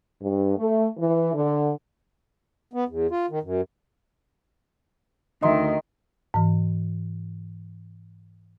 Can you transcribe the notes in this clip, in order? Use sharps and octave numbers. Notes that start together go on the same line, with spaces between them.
G2
A3
E3
D3
B3
E2
F4
D#3
F#2
D2 D#3 D#4 D#5 E5 C6
G#2 E3